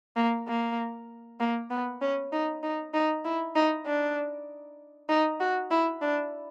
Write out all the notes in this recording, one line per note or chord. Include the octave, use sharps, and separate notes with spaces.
A#3
A#3
A#3
B3
C#4
D#4
D#4
D#4
E4
D#4
D4
D#4
F#4
E4
D4